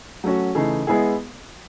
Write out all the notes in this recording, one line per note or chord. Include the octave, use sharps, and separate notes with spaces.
F#3 A3 C#4 F#4
C#3 E3 A3 D#4 G#4
G#3 B3 E4 G#4